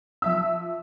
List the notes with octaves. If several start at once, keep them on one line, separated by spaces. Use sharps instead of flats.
F3 E5 E6